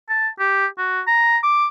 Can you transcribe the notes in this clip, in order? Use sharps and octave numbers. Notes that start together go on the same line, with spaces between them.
A5
G4
F#4
A#5
D6